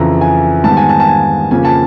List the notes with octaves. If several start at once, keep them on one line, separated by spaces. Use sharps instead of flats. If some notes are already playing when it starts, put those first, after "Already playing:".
Already playing: F2 C#3 E3 A#5
G#5
G#2 D#3 G3 B3 A5
G#5
A5
A5
G#5
F2 C#3 F3 A#3 G#5
A5